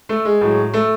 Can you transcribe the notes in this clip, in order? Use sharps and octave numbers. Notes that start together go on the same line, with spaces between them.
A3
G#3
A2 F#3
A3